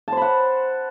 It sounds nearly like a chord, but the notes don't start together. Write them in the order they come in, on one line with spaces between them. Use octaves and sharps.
A5 C5 B5 F#5